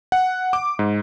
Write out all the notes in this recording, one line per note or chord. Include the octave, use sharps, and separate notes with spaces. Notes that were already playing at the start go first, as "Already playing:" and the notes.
F#5
D6
G#2